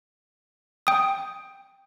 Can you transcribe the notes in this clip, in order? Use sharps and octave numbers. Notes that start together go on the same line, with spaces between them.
G5 D#6